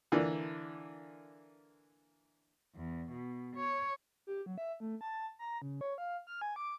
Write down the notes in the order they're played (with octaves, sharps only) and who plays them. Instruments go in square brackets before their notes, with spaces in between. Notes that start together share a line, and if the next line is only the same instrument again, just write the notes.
[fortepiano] D3 E3 A#3 D4
[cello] E2
B2
C#5
[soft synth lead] G4
F#3
E5
A3
A5
A#5
C#3
C#5
F5
F6
G#5
D6